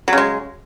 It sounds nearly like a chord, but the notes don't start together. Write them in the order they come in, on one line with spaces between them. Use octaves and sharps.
F#3 C#3 G#3